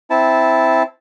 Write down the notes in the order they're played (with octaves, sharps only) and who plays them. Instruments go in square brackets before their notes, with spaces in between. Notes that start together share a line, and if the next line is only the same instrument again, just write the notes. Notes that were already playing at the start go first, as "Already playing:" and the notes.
[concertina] C4 E4 A5